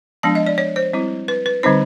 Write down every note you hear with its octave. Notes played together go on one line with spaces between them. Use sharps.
F3 G#3 B3 D4 A5
D#5
D5
C#5
C5
G3 C4 E4
B4
B4
D3 G3 C4 D#4 C5